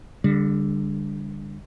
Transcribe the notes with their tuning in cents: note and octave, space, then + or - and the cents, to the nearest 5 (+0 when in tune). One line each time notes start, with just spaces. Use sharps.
D3 +0 G3 +40